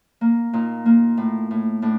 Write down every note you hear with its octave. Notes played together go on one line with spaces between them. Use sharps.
A#3
A#2 D#4
A#3
A2
A2
A2 D4